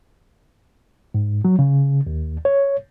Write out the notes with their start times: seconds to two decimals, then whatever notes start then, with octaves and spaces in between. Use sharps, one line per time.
1.14 G#2
1.45 F#3
1.59 C#3
2.07 D#2
2.45 C#5